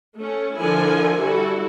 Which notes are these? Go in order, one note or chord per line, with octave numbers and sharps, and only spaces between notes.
A3 C#4
D3 F3 E4 F4 A#4 G#5
G3 E4 F#4 A4